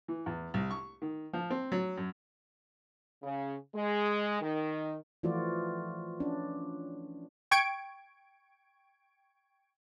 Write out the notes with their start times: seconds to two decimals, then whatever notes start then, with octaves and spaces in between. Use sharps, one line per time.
0.08 E3
0.26 E2
0.54 C2
0.71 C#6
1.02 D#3
1.33 F3
1.50 C4
1.72 F#3
1.97 F#2
3.23 C#3
3.75 G#3
4.41 D#3
5.23 E3 F3 A3 F4 F#4 D5
6.20 C#4 D4
7.51 G5 C#6 G#6 D7